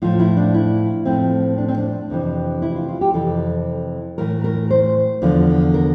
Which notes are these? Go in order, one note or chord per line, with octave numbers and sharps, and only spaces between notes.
A2 F3 F4
E4
D4
E4
A2 F3 C4
D4
C4
D4
F2 C3 E3
E4
F4
F4
G4
F2 C3 E3 A4
A2 E3 A#4
A#4
C5
E2 D3 F3
A#4